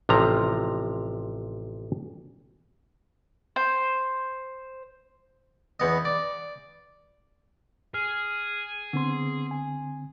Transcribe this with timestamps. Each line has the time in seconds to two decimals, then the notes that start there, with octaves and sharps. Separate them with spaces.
0.09 A1 C3 F3 A#5
3.56 C5
5.80 E2 B3 D#5
6.05 D5
7.94 G#4 F6
8.93 D3 B3 C4 C6
9.51 G#5